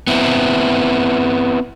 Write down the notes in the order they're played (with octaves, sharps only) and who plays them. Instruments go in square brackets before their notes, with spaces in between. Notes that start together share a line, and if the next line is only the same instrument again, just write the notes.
[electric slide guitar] B3 C4 E4